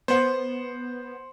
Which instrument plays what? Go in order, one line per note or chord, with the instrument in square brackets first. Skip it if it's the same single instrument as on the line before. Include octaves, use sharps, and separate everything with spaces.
[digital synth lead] B3 [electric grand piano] C5 F#5